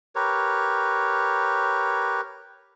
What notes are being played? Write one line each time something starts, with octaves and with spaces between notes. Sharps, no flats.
G4 A#4 B4 C#5